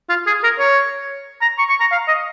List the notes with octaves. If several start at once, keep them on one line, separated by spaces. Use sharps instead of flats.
F4
G#4
A#4
C#5
A#5
C#6
C#6
A#5
F5
D#5